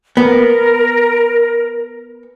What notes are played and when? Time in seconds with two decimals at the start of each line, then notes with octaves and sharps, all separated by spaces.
0.17 B3 A#4